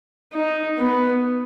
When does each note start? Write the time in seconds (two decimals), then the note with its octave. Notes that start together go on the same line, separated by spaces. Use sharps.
0.34 D#4
0.78 B3